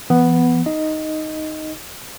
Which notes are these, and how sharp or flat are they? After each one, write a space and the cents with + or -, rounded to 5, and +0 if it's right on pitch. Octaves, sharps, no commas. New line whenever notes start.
E3 +35 B3 +0
D#4 +0 D#5 +0